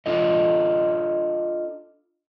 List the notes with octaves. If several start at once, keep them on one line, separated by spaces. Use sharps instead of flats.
D4 F4 A4 D#5